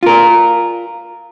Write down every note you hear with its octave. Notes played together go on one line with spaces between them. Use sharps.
F4 A#4